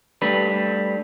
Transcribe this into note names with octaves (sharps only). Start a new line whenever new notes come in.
G3 A3 D4 B4